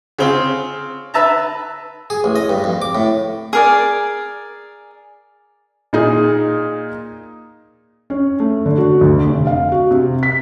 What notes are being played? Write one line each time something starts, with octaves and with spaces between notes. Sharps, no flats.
C#3 C4 F4
B4 E5 A5 A#5
G#4
A1
D#5
G2
F2
D6
A2
G#4 A#4 D5
A#2 D#4 G#4
C#4
A3
D3
F#4
D2
F1
F5
F#4
C3
B6